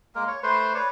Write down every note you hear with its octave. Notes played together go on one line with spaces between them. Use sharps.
G#3 A#3 A#4
C#5
A3 B4 C5 C6
B4 C#5 D5